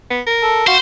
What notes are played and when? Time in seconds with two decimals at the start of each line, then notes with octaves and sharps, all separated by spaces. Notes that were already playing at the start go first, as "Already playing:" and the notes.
0.11 B3
0.27 A#4
0.42 A4
0.67 F#4 C5 F5